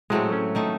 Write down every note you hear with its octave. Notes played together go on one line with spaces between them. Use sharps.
A2 F#3 G#3 A3 C4
C#4
D#3 A3 D#4